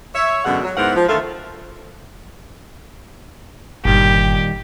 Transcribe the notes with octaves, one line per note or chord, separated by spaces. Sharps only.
C#5 E5
F#2 B2 D3 G#3 F#5
F#3
G#2 B3 E4 A#4 C5 F#5
F3
D3 D#3 A3 F4 A4
G1 A#2 D#3 G3 G4